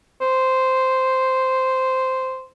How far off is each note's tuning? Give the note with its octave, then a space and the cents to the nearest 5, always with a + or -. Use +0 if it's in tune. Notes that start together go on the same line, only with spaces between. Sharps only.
C5 -5